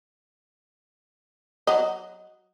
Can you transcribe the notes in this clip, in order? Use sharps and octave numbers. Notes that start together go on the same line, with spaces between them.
F#3 D#5